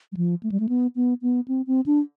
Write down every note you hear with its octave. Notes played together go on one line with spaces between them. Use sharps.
G3
F3
A3
G3
A3
B3
B3
B3
C4
C4
D4